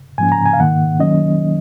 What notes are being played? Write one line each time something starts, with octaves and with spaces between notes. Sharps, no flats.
G#2 F3 A#3 C#4 G#5
A#5
G#5
F5
G#2 D#3 A#3 F#5
D#3 F#3 A#3 C#4 D#5